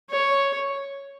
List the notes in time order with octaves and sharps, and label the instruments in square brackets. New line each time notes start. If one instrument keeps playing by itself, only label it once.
[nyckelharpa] C#5